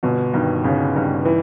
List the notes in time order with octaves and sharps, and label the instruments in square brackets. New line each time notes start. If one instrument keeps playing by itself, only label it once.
[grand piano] G1 [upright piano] B2
[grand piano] G2 D#3
[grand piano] G1 [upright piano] C#3
[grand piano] G2 D#3
[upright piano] E3